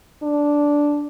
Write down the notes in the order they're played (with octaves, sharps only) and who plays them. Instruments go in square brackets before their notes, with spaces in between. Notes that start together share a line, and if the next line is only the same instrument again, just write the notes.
[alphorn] D4